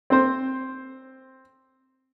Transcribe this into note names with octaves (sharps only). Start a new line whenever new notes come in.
C4 C5